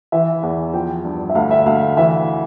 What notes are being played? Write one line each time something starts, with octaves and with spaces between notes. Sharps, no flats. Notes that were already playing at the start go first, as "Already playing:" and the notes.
E3 E5
E2
F3 G5
G2
E5
D2 F5
E5
D2 F5
F5
E3 E5